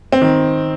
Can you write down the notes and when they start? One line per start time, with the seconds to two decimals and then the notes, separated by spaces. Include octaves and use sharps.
0.12 C4
0.22 D#3